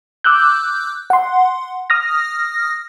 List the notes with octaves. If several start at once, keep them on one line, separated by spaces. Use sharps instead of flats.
D6 E6 F#6 G6
F#5 C6
D#6 F6 A#6